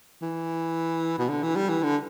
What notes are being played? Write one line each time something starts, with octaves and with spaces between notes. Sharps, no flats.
E3
B2
D3
E3
G3
E3
D3